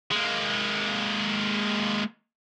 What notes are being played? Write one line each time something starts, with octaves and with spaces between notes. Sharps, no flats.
G#3 A#3